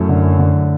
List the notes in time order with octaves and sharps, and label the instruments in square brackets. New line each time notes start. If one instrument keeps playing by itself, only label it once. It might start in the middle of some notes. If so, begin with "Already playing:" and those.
Already playing: [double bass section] F#2 [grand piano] A3 E4
[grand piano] D3
D3